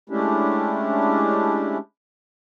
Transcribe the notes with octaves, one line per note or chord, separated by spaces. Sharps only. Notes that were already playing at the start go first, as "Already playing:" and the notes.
G#3 A3 C#4 D4 E4 G4